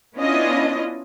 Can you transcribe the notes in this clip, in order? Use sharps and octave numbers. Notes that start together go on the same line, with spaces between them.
B3 C#4 D4 E4 F4 D#5